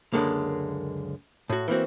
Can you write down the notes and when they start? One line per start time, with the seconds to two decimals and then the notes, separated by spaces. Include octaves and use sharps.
0.13 C#2 F#2 D3 G#3 A#3
1.49 A2 F#4
1.68 E3 A#3 C4 F#4